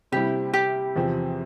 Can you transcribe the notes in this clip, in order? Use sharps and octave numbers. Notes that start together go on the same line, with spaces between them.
C3 G3 C4 E4 G4
G4
E2 C3 F3 C4